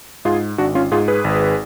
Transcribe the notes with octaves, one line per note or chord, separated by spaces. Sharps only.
G#2 F4 G#4
G#1 D4 F#4
C#4 F4
G#2 F4 G#4
G#4 B4
G#1